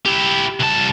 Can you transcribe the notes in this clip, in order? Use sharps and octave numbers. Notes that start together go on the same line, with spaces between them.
E4 G4
C2 A5